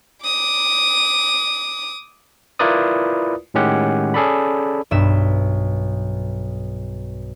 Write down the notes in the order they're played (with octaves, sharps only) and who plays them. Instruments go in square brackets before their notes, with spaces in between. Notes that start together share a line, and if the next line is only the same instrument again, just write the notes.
[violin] D6 D#6
[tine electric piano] E4 F4 A#4 B4 D5 D#6
A2 D#3 G#3 C#4 G4 F#5
C#4 G#4 A4 D5 B5
[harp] B1 G2 E5 E7